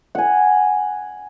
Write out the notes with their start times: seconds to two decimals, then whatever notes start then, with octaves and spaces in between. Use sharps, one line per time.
0.15 F#5 G#5